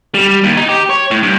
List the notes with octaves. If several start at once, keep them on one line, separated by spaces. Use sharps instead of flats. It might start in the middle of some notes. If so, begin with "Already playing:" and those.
G3
D#2
D#4
G4
C#5
A2
G2